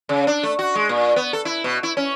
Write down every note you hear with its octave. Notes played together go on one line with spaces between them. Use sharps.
C#3
D4
A3
F#4
G#3
A#2
B3
A4
E4
B2
E4
C#4